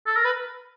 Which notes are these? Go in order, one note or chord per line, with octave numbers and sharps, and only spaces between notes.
A4
A#4
B4